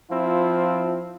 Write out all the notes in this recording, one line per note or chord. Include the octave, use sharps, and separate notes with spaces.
F3 C4 E4 F4